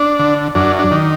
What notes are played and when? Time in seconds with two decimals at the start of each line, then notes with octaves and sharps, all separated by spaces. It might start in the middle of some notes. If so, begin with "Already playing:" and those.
Already playing: D4
0.19 D3
0.55 F#2 D4
0.79 D4
0.91 D#3